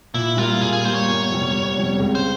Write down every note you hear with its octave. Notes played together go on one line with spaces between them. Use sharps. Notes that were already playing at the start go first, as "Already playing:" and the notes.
A#2 E4
G3 A#3 F4
A#2 G#4
G#4
G3 A#3 C5
C#5
G1
F2 C3 G3
G1
F2 C3 G3
C#2
C5